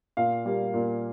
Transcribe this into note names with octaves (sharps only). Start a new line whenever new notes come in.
A#2 F5
G3 A#3
A#2